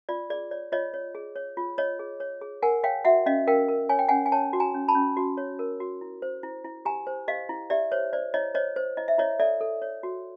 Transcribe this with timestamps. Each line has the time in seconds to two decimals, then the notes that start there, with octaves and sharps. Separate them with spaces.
0.09 F4 D5
0.30 G#4 D5
0.51 C#5 D5
0.72 F4 C#5 D#5
0.94 C#5
1.15 G#4
1.36 C#5
1.57 F4
1.78 C#5 D#5
1.99 G#4
2.20 C#5
2.41 G#4
2.62 A#4 F#5 G#5
2.84 C#5 F5 G5
3.05 F#4 E5 F#5
3.26 C#4 D#5 F5
3.47 A#4 F5 G5
3.68 A#4
3.89 C#5 G#5
3.99 G5
4.09 C#4 F#5 G#5
4.26 G#5
4.32 C#5 G5 A5
4.53 F#4
4.60 G#5 A#5
4.74 C#4
4.88 A5 B5
4.95 C#4
5.17 F#4
5.37 C#5
5.59 A#4
5.80 F#4
6.01 E4
6.22 C5
6.43 E4
6.64 E4
6.85 G4 G#5 A#5
7.07 C5
7.28 G4 D#5 F5
7.49 E4
7.70 G4 D5 E5
7.92 C5 C#5
8.13 C5 D5
8.34 E4 C#5 D#5
8.55 C5 C#5 D#5
8.76 C5
8.97 E4 D#5
9.08 E5
9.18 E4 C#5 D#5
9.40 A4 D5 E5
9.61 A4
9.82 C#5
10.03 F#4